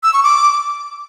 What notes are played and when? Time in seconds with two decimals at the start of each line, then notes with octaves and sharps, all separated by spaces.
0.03 E6
0.13 C#6
0.23 D6